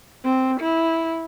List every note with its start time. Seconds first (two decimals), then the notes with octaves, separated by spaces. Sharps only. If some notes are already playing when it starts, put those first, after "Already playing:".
0.24 C4
0.60 E4